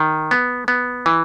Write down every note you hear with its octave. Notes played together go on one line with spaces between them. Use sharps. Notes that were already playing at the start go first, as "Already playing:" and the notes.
Already playing: D#3
B3
B3
E3